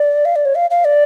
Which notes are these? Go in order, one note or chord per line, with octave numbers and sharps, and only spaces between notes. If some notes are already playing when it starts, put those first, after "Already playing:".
Already playing: D5
F5
D5
C#5
F5
F5
D5